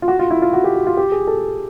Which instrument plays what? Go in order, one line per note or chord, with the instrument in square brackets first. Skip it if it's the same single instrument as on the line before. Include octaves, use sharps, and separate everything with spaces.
[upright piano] F4
F#4
F4
E4
F4
F#4
G4
F#4
F4
G4
G#4
A4